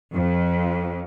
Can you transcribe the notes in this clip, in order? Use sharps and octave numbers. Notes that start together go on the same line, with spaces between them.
F2